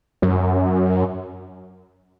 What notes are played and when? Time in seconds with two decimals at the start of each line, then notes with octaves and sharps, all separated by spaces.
0.22 F#2